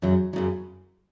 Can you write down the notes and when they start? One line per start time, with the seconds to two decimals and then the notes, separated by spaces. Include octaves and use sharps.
0.02 F#2 C#3 F#3
0.33 F#2 C#3 F#3